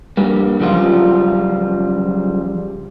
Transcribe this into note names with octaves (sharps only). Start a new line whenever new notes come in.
G2 G3 A#3
F#2 C#3 F3 G3 F4